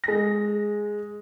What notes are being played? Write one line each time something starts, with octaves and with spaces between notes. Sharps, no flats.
G#3 A#6